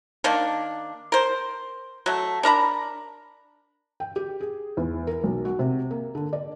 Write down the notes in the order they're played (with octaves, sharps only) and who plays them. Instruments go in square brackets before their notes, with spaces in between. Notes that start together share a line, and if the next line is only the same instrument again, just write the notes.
[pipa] D#3 A#3 D4
A#4 C5
F#3 A3
D4 A#4 A#5 B5
[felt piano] G5
G4
G#4
E2
A#4
B1
F#4
C3
A#3
D3
D5